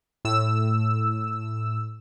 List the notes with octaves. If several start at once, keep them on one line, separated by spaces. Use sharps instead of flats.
A2 E6